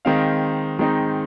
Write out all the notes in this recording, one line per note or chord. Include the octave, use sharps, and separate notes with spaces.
D#3 G#3 C4 D#4 F5
D#3 G#3 C4 D#4